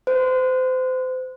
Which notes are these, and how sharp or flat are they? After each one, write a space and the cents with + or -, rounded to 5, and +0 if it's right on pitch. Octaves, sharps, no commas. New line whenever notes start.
C5 -30